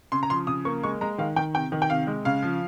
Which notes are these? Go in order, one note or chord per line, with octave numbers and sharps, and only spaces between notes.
C#3 C6
A#5
F3 C6
C#3 D#6
A#3 C#6
G#3 C#6
G#3 A#5
D#3 F5
D#3 G5
C3 G5
D#3
G5
C3 F5
G#3
C#3 F5
F3